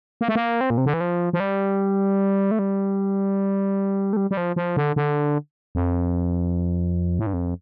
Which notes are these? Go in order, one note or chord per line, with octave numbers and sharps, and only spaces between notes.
A#3
A3
A#3
C4
A#2
C3
D3
E3
F3
F3
G3
A3
G3
A3
G3
G3
F3
F3
D3
D3
F2
A2
G2
F2